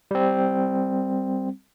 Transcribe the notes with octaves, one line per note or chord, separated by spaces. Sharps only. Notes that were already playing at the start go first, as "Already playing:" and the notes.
G3 C4